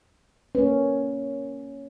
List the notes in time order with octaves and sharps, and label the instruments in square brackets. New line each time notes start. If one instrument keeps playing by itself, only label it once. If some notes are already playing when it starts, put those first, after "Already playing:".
[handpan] A#3 C#4 [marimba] B4